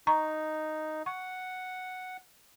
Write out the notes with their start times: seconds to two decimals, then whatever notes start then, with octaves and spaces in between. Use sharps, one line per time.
0.07 D#4 A#5 C#6
1.06 F#5 C#6